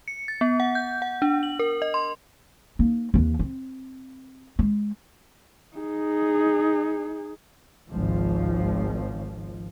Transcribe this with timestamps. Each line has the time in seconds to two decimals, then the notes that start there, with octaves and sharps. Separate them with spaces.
0.08 C#7
0.28 A6
0.41 B3
0.60 F#5
0.75 G6
1.02 F#5
1.22 D4
1.43 F#7
1.59 A#4
1.82 D#5
1.94 C6
2.79 A#3 D#4
3.14 D#2 E3
3.39 C4
4.59 G#3
5.76 D#4 G#4
7.89 G#1 C#2 F3